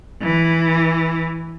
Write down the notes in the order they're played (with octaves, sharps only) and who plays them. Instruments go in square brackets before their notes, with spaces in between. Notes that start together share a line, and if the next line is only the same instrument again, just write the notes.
[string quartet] E3